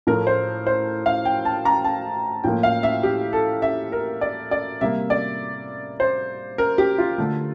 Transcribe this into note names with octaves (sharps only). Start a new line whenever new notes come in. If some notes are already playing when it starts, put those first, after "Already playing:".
A2 F3 A3 A#4
C5
C5
F5
G5
A5
A#5
A5
A2 F3 A#3 G5
F5
E5
G4
A4
E5
A#4
D5
D5
C3 G3 A#3 E5
D5
C5
A#4
G4
F4
D3 A3